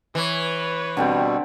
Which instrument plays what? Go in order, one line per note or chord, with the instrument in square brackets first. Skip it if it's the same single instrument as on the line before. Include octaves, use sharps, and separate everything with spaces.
[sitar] E3 [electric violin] B4 C#5
[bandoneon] B2 G3 [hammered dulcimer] D3 C4 G5